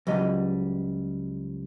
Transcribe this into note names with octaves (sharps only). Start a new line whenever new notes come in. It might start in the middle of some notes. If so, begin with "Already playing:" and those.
C#2 F#3 G3 D#5